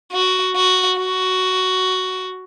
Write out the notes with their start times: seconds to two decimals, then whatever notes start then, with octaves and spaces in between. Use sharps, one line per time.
0.12 F#4
0.56 F#4
0.99 F#4